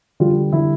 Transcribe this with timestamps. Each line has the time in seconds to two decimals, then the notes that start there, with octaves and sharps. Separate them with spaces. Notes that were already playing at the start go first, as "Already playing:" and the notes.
0.20 D3 G3 F4
0.53 D3 G3 E4